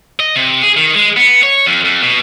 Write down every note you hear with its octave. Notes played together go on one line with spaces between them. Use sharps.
D#5
C3
G#4
D#3
G#3
B3
C#5
F2
F2
B2